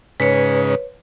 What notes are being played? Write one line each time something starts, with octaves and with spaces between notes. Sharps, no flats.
G#2 C#3 B4 C#5